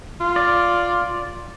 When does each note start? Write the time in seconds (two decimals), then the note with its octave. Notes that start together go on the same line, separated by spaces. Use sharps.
0.21 F4
0.36 D5